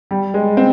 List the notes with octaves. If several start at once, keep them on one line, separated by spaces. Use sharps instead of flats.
G3
G#3
C4